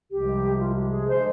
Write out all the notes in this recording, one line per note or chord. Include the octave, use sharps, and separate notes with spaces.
C2 C3 F3 G#3 G4
F4
G4
G#4
D3 G#3 D4 C5